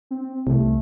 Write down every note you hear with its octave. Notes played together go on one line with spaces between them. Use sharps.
C4
C2 A3